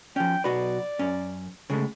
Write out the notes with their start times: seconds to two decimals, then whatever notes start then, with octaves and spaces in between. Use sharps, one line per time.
0.16 F3 C#4 G5
0.44 B1 F#4 B4 D5
0.99 F#2 C#4
1.70 C#3 G#3 A3